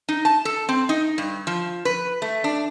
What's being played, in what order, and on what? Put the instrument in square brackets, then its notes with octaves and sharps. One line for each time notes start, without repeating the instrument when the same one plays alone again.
[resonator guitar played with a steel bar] D#4
A5
A4
C4
D#4
G2
F3
B4
A3
D4